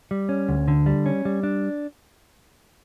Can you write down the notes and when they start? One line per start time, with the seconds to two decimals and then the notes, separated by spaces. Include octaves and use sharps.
0.11 G3
0.29 C#4
0.49 D2
0.68 D3
0.86 G3
1.06 C#4
1.25 G3
1.43 D4